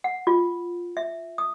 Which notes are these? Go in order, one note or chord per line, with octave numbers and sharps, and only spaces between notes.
F#5
F4
E5
D#6